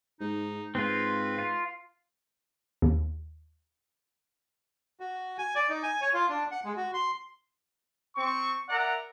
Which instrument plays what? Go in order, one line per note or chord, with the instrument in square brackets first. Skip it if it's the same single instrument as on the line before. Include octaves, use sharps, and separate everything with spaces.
[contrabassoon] G#2 [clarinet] D#4
[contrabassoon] G#2 [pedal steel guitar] C4 F4 [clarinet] B4
[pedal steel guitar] F4
[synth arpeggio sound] D#2
[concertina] F#4
G#5
D5
D#4
G#5
C#5
F4
D4
F#5
G#3
F#4
C6
[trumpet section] C4 C#6
A#4 D5 E5 F#5 A#5